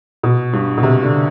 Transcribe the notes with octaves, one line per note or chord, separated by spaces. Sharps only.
B2
G2
B2
C3
D3